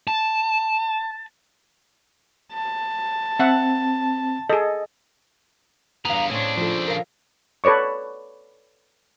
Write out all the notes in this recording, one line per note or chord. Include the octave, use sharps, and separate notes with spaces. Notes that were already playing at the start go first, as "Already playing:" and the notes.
A5
A5
C4 E5 F#5
G#4 A4 D#5
E2 G2 B3 F5 A#5
A2 C#3 C4 D4 C#5
F3 A4 C5
A#4 F5
A4 B4 C#5 D5 C#6